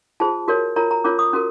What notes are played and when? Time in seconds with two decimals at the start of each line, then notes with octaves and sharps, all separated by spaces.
0.20 F4 G#4 C5 A5
0.48 F#4 A#4 C#5
0.76 F4 A#4 C#5 A#5
0.91 A#5
1.04 C#4 F4 A#4 C#5 D6
1.19 D#6
1.33 C#4 F#4 A#4